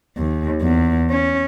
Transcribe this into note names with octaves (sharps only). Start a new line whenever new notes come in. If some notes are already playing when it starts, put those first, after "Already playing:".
D#2
E2
C#4